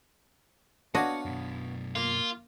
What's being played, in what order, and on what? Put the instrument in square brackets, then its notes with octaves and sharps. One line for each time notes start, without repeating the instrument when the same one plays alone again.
[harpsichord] B3 C#5 F5 [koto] D4 F#4 D#5 [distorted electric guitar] F#5
[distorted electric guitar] F#2 B2
[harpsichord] A#3 [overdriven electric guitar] F4